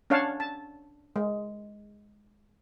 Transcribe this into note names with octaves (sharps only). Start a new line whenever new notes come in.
C#4 D4 C#5 F5 F#5 A5
A5
G#3